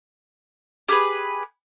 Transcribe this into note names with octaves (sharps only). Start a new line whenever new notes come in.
G4 G#4 B4